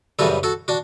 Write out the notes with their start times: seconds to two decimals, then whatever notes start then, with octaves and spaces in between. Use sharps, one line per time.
0.19 F#2 C#3 E3 G3 F#4 A4
0.43 F#4 A4
0.68 D4 F#4